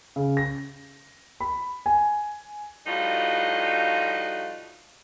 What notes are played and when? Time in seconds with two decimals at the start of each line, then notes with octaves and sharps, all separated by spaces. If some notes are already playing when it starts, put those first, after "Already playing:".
0.16 C#3
0.37 A#6
1.40 B5
1.86 G#5
2.87 A2 F3 G3 D#4 F4 F#4